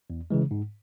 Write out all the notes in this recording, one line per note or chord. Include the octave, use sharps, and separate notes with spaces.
E2
C#3 E3 G#3
G#2